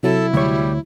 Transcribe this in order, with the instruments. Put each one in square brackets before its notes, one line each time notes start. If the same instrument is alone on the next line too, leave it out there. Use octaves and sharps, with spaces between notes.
[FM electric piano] C3 F#3 [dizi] E4 [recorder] A4
[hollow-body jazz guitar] D2 C#5 [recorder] G3